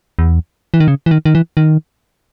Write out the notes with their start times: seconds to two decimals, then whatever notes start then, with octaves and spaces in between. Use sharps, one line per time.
0.19 E2
0.74 E3
0.80 D#3
0.88 C#3
1.06 E3
1.11 D#3
1.25 D#3
1.35 E3
1.57 D#3